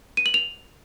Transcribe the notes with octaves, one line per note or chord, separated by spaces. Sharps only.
D#7
F#7
F7